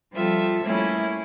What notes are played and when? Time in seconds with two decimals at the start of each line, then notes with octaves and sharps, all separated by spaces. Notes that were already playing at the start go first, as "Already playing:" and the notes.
0.12 F3 G3 C4 F4 A4 E5
0.62 G3 A3 A#3 C#4 E4